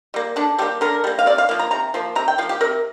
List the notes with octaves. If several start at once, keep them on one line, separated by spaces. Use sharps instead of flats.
G3 A#3
D3 D4
G3 A#3 G4
D3 A#4
G3 A#3
F5
C3 D5
F5
F3 A#3 F5
A#5
C3 A#5
F3 A#3
C3 A#5
G5
F3 A#3 F5
G4
C3 A#4